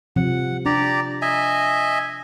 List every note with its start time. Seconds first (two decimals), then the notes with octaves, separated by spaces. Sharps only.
0.16 C3 F3 F#5
0.65 D4 G4 D5 A#5
1.22 D#5 E5 G#5